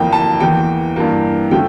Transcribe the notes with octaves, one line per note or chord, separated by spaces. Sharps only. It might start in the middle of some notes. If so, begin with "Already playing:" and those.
Already playing: G1 F2 E3 A#3 G5
A5
E2 E3 A#3 G5
G2 E3 A#3
D3 F3 A3 G5